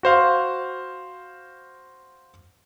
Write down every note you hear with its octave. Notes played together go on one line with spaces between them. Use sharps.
F#4 C5 F5